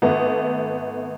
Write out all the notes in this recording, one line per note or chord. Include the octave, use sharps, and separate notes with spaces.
G#1 A3 B3